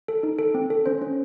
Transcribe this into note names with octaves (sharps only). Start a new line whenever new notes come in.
A4
D#4
A4
C4
A4
C#4 C5
C#4